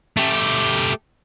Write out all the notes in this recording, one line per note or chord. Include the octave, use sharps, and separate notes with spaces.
A3 G4